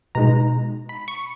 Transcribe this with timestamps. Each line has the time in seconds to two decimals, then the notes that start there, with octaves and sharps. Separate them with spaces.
0.15 B2 G#3 D#4 A#5
0.89 B5
1.08 C#6